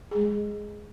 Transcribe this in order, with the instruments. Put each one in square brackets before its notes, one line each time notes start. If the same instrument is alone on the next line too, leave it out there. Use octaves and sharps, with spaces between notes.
[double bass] G#3 [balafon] G#4